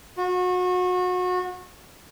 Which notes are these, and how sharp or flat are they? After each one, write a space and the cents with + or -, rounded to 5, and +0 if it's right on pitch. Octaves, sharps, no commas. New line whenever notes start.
F#4 -30